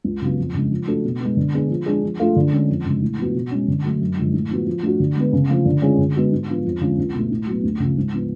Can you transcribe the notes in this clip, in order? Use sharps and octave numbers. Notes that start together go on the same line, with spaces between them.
C#2
C#3 F#3 B3 F4
F2
C#3 G#3
F3
A3 D4 F#4 A4
B2
G#3 B3
D3
G#3 B3 D4 G#4
F3
G#3 D4 G#4
F3
A3 F4 A4
D3
G#3 C#4
F2
C#3 G#3
A2
F3 B3 F#4
B2
G#3 C#4
D3
F#3 A3
F#2
D3 F3 G#3
A2
F3 B3 F#4
F3
A3 D4 F#4
D3
G#3 B3
C#3
F3 A3 F4
D3
G#3 C#4 F4 G#4
D3
G#3 B3 F#4
G#2
F3 B3 F4
F2
D3 G#3 C#4 F4
C#2
B2 A3
A2
F#3 B3
D2
C#3 F3
G#2
F3 B3